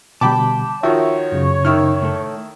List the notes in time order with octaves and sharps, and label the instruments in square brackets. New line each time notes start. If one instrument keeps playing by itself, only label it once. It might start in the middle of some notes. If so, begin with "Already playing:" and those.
[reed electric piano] B2 D3 G3 [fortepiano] G5 B5 D6 [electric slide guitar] A5
[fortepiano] D#3 F3 F#4 [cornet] C#5 [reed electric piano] E5
[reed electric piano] F#2 C#3
[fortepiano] D#3 E4 F6 [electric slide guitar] D#4
[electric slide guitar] A2 A4